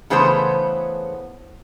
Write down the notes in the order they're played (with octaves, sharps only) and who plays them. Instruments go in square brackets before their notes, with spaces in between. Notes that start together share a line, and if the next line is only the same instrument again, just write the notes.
[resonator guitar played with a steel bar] C#3 E3 A3 B3 C#4 C5